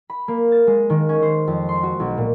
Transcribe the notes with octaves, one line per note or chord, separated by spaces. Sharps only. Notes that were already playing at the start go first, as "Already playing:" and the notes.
B5
A#3
A6
G#3
D#3
C#4
C5
F2
C6
F#4
B1
A#2